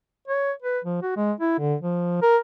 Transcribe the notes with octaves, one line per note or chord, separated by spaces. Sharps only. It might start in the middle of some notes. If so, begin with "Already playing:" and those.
C#5
B4
F3
F#4
G#3
E4
D3
F3
A#4